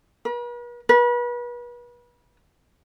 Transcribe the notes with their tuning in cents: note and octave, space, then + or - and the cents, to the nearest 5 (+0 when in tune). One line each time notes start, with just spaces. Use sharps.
B4 -45
B4 -35